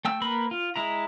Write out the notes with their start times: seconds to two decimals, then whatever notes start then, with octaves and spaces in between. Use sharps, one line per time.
0.05 A3 G5 E6
0.21 A#3 A#4 B4 B5
0.51 F4
0.76 G#3 E4 A#5